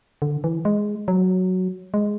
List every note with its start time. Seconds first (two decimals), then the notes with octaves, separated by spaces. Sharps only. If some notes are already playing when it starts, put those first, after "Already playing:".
0.22 D3
0.44 E3
0.65 G#3
1.08 F#3
1.94 G#3